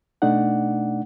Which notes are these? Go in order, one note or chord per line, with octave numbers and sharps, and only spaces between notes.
B2 A3 D4 D#4 D5 F#5